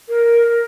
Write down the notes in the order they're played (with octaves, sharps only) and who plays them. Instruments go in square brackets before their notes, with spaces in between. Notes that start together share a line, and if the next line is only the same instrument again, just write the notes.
[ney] A#4